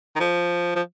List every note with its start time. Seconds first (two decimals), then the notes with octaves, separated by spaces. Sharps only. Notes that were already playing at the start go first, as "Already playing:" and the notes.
0.16 D#3
0.20 F3
0.76 F3